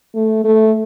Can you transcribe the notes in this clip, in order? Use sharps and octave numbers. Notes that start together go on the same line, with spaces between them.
A3
A3